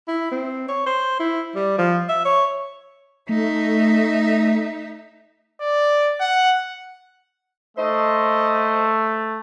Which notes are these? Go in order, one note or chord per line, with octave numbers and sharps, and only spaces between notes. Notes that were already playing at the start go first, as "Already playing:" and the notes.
E4
C4
C#5
C5
E4
G3
F3
E5
C#5
A3 D#4 E5
D5
F#5
A3 C5 D#5